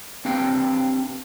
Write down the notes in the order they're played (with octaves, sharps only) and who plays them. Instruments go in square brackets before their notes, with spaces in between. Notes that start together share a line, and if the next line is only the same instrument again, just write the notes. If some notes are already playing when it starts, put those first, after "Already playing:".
[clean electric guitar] C4 D4 G4 B4 F5 G5